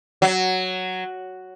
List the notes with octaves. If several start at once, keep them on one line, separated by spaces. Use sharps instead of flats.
F#3